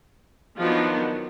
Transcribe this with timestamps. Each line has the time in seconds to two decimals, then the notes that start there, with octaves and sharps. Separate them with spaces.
0.58 D#3 F3 F#3 B3 D4 F4